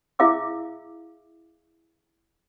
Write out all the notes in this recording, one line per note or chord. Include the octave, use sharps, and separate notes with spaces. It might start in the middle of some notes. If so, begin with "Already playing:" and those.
E4 G#4 E5 F5 D6 E6